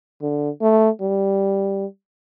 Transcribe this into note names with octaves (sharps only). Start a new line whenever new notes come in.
D3
A3
G3